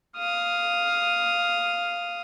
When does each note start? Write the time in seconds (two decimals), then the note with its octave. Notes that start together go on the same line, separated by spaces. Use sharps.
0.17 F5 D#6